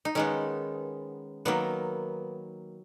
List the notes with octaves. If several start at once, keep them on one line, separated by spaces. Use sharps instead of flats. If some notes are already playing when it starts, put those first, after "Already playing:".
D#4
D#3 G#3 B3 C#4
D#3 F#3 A#3 B3